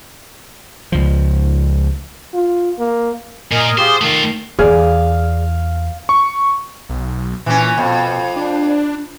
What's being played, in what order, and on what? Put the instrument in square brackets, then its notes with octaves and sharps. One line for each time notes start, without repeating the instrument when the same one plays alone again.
[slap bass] C#2 F3
[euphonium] F4
A#3
[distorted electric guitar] A#2 [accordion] A#4 D#5 G#5
[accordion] F4 G4 G#4 [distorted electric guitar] C5
[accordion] D#3 [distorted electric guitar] A3 F4
[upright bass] E2 [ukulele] G#4 D5 [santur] F5
[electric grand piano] C#6
[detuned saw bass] B1
[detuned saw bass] A#2 [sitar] E3 C#4
[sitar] F2 [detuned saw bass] B2
[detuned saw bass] D4